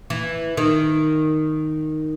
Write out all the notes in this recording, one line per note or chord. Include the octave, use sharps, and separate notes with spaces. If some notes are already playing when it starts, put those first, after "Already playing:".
E3
D#3